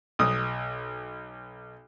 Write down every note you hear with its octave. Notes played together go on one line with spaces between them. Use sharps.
B1 D#6